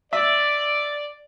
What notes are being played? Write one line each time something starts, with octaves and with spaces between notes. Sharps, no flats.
D5 E5